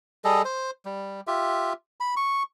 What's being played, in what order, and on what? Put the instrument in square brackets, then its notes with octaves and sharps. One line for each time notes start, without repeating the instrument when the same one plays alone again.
[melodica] G3 G#4 A4 D#5
C5
G3
F4 G4 E5
B5
C#6